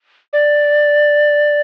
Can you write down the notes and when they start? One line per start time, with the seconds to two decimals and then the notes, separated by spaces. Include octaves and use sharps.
0.33 D5